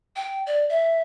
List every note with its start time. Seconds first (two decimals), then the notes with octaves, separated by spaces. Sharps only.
0.16 G5
0.46 D5
0.70 E5